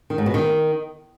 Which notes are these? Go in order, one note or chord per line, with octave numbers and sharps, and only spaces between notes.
D#3
G#2
B2
D#3